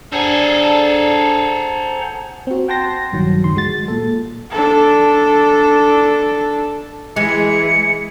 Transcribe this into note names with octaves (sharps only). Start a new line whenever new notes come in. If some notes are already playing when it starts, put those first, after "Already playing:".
D4 G#4 A4 C5 F#5 A#5
C4 F#4
F#5 G5 A5 C6 A#6
A#1 G2 D#3 F#3
G1 C#2 D#3 C6
G#3 F#4 A6
A#2 A4
D4 A4
E3 G#3 G#4 C#7